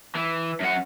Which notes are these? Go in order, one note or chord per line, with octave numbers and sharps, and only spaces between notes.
E3
F#2 F#5